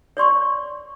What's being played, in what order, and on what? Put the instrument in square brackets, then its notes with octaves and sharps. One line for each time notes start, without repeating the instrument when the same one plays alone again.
[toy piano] C#5 D5 C6 C#6